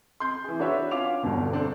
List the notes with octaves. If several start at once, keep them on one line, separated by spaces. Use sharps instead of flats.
C6 G6
E3 G#4
D4 F#4 B4 C#5 E5
C#4 F4 F5 D6 F7
G1 E2 G2 B2 D3
C4 D4 A4 C5 D5